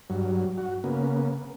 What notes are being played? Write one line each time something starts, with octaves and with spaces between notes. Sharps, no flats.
G2 F#3
F#4
C#3 A#3 B3